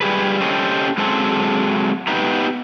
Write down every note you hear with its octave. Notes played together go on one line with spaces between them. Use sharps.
G3 G4 G#4 B4
C#4 G4 A4 C5 C#5 D#5
F#3 G#3 C4 A4
B3 D#4 G4 B4 A#5